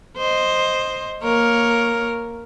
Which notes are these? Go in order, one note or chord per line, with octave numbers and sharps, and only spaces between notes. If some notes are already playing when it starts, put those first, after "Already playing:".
C5 D#5
A#3 A#4 C#5